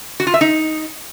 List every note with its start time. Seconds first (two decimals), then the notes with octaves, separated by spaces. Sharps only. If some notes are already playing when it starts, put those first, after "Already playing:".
0.20 F#4
0.27 F4
0.34 E5
0.41 D#4